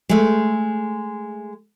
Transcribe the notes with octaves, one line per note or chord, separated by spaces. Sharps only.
G#3 A3